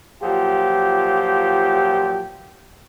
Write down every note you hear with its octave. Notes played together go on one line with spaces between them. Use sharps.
A#2 F3 F#3 G4